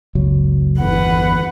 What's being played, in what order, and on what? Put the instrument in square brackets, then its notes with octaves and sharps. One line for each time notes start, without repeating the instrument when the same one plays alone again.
[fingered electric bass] F#1 C#2 F#3
[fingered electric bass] G1 E2 [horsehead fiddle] B4 F#5